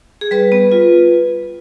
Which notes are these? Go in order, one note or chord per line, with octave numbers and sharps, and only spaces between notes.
G#4
G3 B4
B3
F4